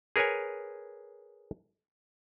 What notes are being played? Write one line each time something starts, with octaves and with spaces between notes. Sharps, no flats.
G#4 A#4 B4 C#5 G#5